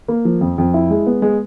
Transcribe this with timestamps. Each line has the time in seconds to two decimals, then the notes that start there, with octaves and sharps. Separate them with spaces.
0.08 A#3
0.25 F3
0.41 F2
0.58 F2
0.74 E4
0.91 G#3
1.06 B3
1.22 G#3